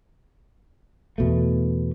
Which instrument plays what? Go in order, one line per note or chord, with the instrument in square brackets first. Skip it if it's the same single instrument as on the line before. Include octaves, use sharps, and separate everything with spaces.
[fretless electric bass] E2 B2 A3